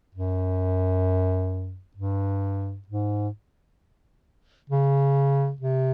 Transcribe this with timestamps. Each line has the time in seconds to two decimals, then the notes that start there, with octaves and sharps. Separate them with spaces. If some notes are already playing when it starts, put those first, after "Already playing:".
0.15 F#2
1.97 G2
2.88 G#2
4.70 C#3
5.61 C3